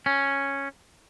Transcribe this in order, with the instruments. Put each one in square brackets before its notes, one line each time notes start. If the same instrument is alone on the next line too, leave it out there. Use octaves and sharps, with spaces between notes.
[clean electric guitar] C#4